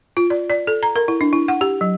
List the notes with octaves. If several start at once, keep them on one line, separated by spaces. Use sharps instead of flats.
F4
D5
D5
A4
A#5
A#4
E4
D4
E4
F#5
G4
F#3